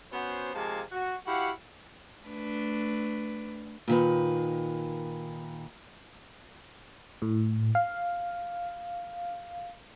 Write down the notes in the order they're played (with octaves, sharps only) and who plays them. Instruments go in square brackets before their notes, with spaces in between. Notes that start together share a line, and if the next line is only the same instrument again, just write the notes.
[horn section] B3 C#4 F#4 C5
C3 F3 G#3 A#3 G#5 A5
F#4
E4 F#4 G4 F5 F#5
[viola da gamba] A3 D4 B4
[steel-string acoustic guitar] A#2 D#3 B4
[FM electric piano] A2
F5